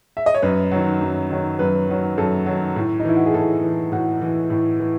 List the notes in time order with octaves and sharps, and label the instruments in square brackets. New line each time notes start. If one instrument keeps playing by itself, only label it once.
[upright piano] E5
D#5
C#5
F#2 B4
D#3 F#3
F#2
D#3 F#3
F#2 B4
D#3 F#3
F#2 A4
D#3 F#3
A2
D#4
E3 E4
F#4
G#4
A2 A4
E3
A2 F#4
E3
A2
E3